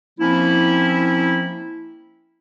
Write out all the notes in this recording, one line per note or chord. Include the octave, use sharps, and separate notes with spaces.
F3 A#3 C4 C#4 E4